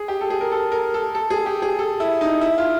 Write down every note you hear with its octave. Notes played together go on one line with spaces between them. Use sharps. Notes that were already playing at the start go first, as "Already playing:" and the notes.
Already playing: G#4
G4
A4
G#4
A#4
A4
A#4
A4
A4
G#4
G4
G#4
A4
E4
D#4
E4
F4